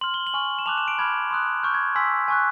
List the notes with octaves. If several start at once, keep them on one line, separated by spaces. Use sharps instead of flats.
C6 F6 F#7
G7
F#7
G#5 C#6 F6
E7
A5 D6 F#6 F7
E7
D7
B5 D6 F6 G#6
C6 D#6 F#6
C#6 F6 G6
G#6
G#5 C6 E6 B6
G#5 C#6 F#6